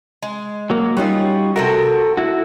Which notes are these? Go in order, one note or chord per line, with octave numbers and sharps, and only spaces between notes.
G#3
F#3 A#3
F#3 G3 C#4 D#4 F4 F#4
C3 A3 F#4 A4 A#4
E4 F#4